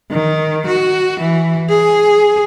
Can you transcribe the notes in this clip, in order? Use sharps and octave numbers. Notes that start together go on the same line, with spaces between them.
D#3
F#4
E3
G#4